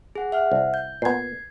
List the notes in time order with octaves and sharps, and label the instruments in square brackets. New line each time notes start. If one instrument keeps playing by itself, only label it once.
[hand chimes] G#4 F#5
E5 F#5 F6
[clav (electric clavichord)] C2
[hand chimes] G6
[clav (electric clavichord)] A#2 B3 [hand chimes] G#6 C7